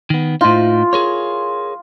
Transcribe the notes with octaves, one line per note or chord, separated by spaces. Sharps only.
D#3 B3
A2 D#4 F4
G#4 A#4 C#5